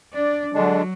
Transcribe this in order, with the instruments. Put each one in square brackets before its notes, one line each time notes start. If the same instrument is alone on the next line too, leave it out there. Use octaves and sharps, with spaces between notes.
[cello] D4 D5
[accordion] D3 G#3 D4 [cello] F#3